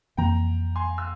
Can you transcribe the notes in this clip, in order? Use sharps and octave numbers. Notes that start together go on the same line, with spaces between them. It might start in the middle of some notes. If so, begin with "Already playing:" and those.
F2 E3 A#3 G5 A#5
G#5 C6
E6